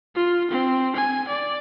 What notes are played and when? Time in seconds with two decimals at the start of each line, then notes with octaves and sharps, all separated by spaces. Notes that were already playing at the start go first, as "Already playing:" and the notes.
0.15 F4
0.51 C4
0.96 G#5
1.28 D5